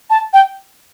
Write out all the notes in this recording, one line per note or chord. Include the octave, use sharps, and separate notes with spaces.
A5
G5